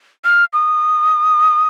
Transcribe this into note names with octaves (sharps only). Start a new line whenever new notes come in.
F6
D#6